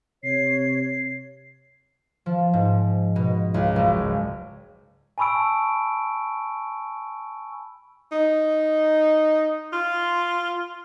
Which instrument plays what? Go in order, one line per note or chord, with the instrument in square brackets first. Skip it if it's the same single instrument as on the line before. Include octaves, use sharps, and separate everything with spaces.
[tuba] C3 [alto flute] C#5 [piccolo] C7
[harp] F3
G#2
B2
C#2
F#1
[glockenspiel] G#5 A5 B5 C#6 E6 D7
[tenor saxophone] D#4
F4